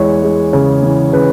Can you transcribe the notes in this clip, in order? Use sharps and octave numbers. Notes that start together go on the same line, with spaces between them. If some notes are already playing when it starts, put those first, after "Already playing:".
Already playing: E2 E3 G#3 C#5
G#3
C#3
E3
C#3 B4